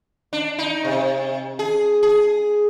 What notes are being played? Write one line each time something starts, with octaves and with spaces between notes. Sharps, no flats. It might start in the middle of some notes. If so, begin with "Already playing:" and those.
D4
D#4
C3
G#4
G#4